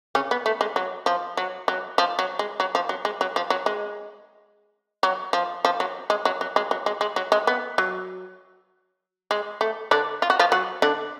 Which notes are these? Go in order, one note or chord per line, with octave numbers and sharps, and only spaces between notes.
C#3 C#4
B3
A3
G#3
F#3
F3
F#3
F#3
F3
F#3
G#3
F#3
F3
F#3
G#3
F#3
F3
F#3
G#3
F#3
F3
F3
F#3
G#3
F#3
F#3
G#3
F#3
G#3
G#3
F#3
G#3
B3
F#3
G#3
A3
D3 D4
F4
F#4
F3 F4
F#3 F#4
D3 D4